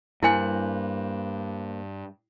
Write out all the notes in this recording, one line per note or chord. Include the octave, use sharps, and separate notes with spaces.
G2 A#3 E4 C5 G#5 F#6